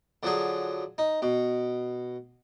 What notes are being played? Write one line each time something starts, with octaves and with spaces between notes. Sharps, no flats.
D3 F3 F#3 G#4
D#4
B2